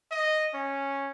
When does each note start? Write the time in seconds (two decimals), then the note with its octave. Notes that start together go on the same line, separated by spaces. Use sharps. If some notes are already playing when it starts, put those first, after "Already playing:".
0.11 D#5
0.54 C#4